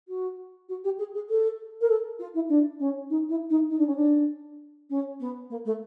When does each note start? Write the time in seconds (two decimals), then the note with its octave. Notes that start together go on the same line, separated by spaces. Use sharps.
0.08 F#4
0.69 F#4
0.84 G4
0.99 G#4
1.13 G#4
1.29 A4
1.81 A#4
1.89 A4
2.19 F4
2.34 E4
2.49 D4
2.79 C#4
3.10 D#4
3.29 E4
3.50 D#4
3.69 D#4
3.78 D4
3.87 C#4
3.96 D4
4.90 C#4
5.20 B3
5.50 A#3
5.65 A3